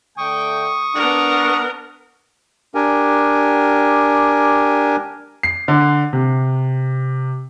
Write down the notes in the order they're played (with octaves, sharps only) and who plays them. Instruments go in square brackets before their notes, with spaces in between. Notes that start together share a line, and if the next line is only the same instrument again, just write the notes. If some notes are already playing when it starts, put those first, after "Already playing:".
[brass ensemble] D3 A3 G5 [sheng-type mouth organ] C#6 D#6
[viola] B3 A#4 [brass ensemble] D4 F#5
[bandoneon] D4 G4 A#4 G#5
[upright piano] C7
D3
C3